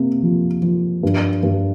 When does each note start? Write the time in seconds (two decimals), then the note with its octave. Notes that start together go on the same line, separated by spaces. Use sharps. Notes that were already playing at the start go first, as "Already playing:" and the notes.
Already playing: C3 A#3
0.22 F3
0.62 F3
1.03 G2
1.43 G2